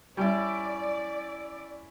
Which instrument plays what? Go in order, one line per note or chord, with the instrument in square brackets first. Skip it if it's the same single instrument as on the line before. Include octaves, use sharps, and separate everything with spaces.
[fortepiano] G3 [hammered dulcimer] C#4 E4 [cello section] D5